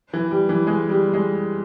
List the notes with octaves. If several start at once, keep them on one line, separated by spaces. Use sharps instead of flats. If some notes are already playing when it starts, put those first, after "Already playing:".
E3
G3
E3
G#3
G3
G#3